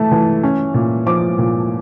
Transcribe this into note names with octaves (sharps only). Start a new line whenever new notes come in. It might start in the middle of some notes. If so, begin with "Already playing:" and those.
Already playing: E3 A3 A5
E3
C#4
A#2
F3 D6
A#2